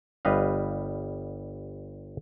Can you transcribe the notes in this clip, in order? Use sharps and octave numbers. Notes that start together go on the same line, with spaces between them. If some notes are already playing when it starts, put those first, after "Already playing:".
G1 G3 B4 D#5 F5